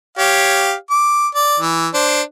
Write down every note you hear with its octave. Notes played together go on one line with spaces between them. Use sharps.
G4 C#5 F5
D6
D5
E3
D4 C5